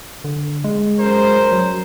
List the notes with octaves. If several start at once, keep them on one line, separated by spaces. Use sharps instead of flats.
D3
G#3
F#2 A#4 C5
F#3